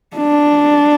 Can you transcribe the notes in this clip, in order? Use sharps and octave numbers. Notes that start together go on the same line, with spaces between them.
D4